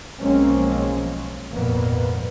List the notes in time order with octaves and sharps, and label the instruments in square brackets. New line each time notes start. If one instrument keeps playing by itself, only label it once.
[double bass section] B1 F3 G#3 A#3 C4 C#4
G#1 F2 A#2 A#3 B3